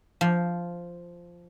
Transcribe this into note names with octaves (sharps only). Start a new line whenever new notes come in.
F3